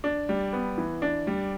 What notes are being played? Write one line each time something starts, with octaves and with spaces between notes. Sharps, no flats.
D4
G3
B3
E3
D4
G3